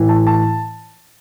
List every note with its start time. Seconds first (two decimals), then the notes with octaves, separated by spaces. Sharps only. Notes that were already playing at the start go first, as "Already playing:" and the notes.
Already playing: A2 E3
0.09 A5
0.27 A5